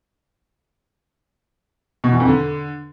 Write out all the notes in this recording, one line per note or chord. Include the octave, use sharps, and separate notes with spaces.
B2
E2
F2
D3